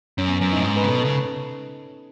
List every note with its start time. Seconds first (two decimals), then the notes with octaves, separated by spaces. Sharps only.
0.18 F#2 C#4
0.29 B3
0.39 F#2 C#4
0.53 A2 D#4
0.64 G#2
0.76 B4
0.83 C#3
0.88 B2 A4
1.05 C#3